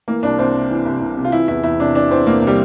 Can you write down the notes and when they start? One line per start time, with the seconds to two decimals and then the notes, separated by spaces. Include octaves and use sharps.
0.08 E3 A#3
0.23 C2 D4
0.39 C2 C4
0.55 C3
0.70 E3
0.86 C2
1.01 C2
1.17 C3
1.25 F4
1.32 E3 E4
1.48 E2 E4
1.63 E2 E4
1.80 C3 D4
1.95 E3 D4
2.11 E2 C4
2.26 E2 A#3
2.42 C3
2.47 G3